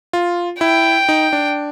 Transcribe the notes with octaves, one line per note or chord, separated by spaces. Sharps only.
F4
E4 G5
D#4
D4